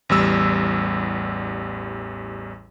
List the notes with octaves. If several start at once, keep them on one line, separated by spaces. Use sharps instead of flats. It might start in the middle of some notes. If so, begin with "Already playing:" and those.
A1 E2 G3 E6